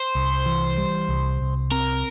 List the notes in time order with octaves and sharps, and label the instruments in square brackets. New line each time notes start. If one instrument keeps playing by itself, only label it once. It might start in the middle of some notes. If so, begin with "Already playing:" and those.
Already playing: [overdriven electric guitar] C5
[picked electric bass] C2
E3
G3
C2
C2
[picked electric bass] C4 [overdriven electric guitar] A#4